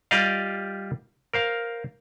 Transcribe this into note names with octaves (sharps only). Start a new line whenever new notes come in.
G3 F4 G4 D5 D#5 F5
A#4 C5 F5